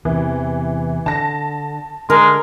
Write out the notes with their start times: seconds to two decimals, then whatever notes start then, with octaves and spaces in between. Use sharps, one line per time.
0.05 E2 C3 E3
1.06 D3 A5 A#6
2.10 D3 G#3 A#4